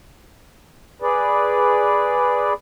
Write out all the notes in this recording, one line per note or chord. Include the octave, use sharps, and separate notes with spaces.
G#4 B4 D5